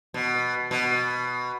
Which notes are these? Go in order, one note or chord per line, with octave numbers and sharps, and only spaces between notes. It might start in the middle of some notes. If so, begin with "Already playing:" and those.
B2
B2